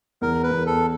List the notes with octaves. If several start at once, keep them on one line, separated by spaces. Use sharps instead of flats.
E2 A#4
B4
E2
A4